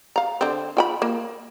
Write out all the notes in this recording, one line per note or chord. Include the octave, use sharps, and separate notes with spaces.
F5 A#5
D3 C4
F4 G5 B5
A#3